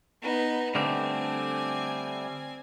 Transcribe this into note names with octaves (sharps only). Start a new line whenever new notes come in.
B3 D#4
D3 G3 A3 C4 G#5